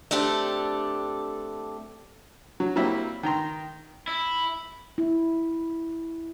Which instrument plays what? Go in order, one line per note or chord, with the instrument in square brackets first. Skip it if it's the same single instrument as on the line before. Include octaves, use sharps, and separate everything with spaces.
[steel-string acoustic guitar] A3 C4 D4 G4 A4
[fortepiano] F#3
F#3 G3 A#3 C4 E4
D#3 G5 A#5 C6
[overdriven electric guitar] E4
[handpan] E4